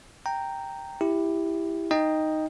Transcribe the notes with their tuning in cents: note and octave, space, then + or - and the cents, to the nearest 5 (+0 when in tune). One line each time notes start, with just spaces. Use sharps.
G5 +0 A#5 -10
E4 +0 G4 +10
D#4 +0 D#5 +0 G5 +10